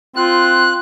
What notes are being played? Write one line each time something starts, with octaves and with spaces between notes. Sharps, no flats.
C4 F4 F#6